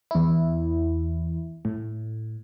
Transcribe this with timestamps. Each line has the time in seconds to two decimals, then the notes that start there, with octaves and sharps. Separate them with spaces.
0.11 E2 E4
1.65 A2